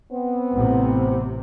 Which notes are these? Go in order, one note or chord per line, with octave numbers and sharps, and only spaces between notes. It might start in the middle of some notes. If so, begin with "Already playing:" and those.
B3 C4
A1 C3